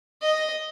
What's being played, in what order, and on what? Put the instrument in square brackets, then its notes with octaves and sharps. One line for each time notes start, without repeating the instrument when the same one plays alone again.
[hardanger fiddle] D#5